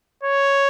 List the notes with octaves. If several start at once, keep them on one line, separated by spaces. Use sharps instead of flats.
C#5